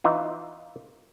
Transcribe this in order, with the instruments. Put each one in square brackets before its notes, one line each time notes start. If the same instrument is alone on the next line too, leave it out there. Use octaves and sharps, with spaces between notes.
[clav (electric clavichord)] E3 D#4 F4